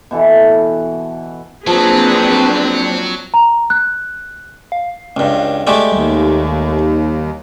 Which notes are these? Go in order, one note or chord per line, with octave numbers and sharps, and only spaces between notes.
B2 E3 A4
F3 F#3 A#3 C4 D4 G#4 B4
A#5
F#6
F5
C#2 G2
G#3 A3 G4 D5
D#2 G3